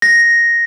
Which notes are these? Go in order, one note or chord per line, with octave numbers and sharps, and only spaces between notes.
A#6